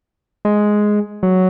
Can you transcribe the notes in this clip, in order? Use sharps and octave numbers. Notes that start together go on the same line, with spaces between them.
G#3
F#3